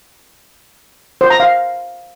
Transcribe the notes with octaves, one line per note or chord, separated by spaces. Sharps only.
C5
A#5
F5